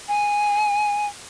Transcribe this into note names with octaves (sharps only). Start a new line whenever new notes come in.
G#5